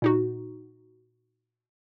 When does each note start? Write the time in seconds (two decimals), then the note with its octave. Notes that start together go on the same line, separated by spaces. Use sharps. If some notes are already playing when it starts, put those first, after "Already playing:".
0.02 A#2 D#4 F#4